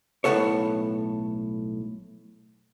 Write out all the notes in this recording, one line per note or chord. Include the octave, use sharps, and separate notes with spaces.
B1 A2 A3 B3 A4 C#5